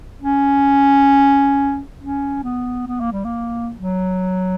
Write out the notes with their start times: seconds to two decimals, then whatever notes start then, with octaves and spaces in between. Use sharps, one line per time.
0.22 C#4
2.00 C#4
2.43 B3
2.87 B3
3.00 A#3
3.12 G3
3.24 A#3
3.77 F#3